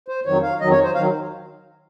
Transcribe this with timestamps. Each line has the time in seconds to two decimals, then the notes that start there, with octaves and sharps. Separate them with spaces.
0.08 C5
0.26 F2 D#3 F#3 C#5
0.42 F5
0.61 F2 D#3 F#3 D#5
0.71 C#5
0.83 C5
0.95 D#3 F#3 F5